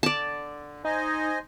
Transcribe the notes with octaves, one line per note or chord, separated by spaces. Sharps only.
D3 D5 A5
D#4 C5 D#5 G#5